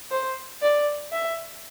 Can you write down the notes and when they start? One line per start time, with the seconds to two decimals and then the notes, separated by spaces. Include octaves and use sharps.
0.11 C5
0.62 D5
1.12 E5